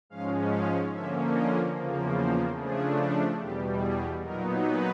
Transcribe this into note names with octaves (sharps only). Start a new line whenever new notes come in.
G#2 F3 G#3 C#4 F5
F5
D3 F3 A#3 C#4 E5
D#5
E2 C#3 F3 A#3
C5
C#3 F3 A3 D4 G#4
E2 B2 G3 G4
G#4
A#2 F#3 B3 D#4 A#4
B4